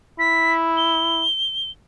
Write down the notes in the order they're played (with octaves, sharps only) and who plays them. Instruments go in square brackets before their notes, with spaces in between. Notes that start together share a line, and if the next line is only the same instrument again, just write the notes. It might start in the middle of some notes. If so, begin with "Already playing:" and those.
[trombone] E4 [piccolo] B6
[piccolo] G7